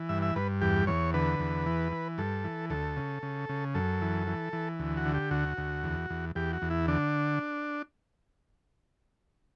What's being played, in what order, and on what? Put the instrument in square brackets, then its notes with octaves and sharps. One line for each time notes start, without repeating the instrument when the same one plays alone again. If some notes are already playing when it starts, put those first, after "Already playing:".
Already playing: [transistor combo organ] E3
G2 E5
E5
G2 B4
E2 G4
E2 C#5
D3 B4
E2
E3
E3
G2 A4
E3
D2 A4
C#3
C#3
C#3
F#2 A4
E3
E3
E3
D2
F#4
D3
G4
D2 F#4
D2
E2
E2
E2 G4
F#4
E2
E4
D3 D4